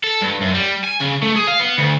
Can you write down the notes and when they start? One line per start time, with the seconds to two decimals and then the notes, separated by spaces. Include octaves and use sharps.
0.04 A4
0.22 G2
0.42 F#2
0.55 G3
0.84 G#5
1.00 C#3
1.23 A3
1.36 G#4
1.48 F5
1.60 B3
1.79 D2